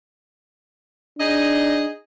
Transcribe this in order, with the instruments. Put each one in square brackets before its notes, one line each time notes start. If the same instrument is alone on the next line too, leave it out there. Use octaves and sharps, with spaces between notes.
[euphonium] D4 [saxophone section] D#4 G#4 D#5